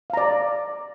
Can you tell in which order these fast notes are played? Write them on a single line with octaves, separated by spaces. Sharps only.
F5 A#5 D5